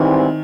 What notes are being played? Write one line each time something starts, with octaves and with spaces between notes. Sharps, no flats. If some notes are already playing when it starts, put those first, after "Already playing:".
Already playing: G#2 D#3 E3 G3 C4